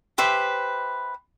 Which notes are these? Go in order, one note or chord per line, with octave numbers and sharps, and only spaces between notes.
G4 B4 C5 E5